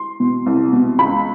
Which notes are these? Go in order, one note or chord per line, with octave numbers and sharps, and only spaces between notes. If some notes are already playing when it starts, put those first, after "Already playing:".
Already playing: C6
B2
C2
B2
C#2 B5